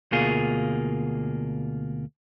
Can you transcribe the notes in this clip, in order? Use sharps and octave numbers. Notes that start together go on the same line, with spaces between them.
D2 B2 A#3 F4 G#4